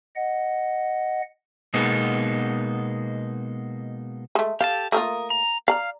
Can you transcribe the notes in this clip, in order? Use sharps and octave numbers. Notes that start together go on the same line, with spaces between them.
D#5 F#5
B2 G#3 A#3 B3 D#4
G#3 A3
G4 A4 F5 A5
A3 A#3 F4 A#4 D#6
A#5
D5 F5 A#5 F6